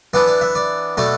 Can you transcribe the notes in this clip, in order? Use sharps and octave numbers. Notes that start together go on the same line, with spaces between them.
E3 B3 D4 D5
D5
E5
D5
B2 A3 D4 D5